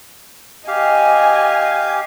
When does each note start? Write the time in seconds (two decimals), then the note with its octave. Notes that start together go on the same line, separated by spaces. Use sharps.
0.68 G4 D#5 F5 G#5